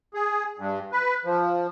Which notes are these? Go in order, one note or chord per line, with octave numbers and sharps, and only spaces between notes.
G#4
G2
B4
F3